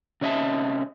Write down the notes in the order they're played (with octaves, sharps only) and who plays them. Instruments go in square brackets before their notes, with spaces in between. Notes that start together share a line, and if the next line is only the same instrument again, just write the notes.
[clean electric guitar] C3 C#4 D#5 E5 A5